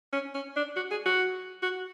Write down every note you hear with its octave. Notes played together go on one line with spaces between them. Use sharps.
C#4
C#4
D4
F#4
G#4
F#4
F#4